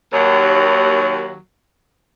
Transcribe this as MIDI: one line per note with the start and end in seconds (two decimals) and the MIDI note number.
0.12 1.36 39
0.12 1.36 54